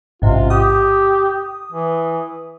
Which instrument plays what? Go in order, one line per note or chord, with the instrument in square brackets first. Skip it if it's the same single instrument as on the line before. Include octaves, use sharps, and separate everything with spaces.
[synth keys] A1 G#2 C3 [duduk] F4
[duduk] G4 [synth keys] D#6
[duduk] E3